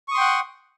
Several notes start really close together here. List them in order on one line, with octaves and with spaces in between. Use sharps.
C#6 D#6 C6 G5 F#5